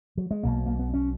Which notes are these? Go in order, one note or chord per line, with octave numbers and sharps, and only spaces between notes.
F#3
G#3
B1 B2 A#3
A#3
B3
C#4